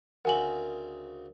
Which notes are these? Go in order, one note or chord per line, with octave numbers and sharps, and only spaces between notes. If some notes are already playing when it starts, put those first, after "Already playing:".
D2 C#3 C4 A#4 F#5 G#5 F#7